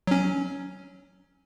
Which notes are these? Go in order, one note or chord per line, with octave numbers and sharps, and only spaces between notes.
F#3 C#4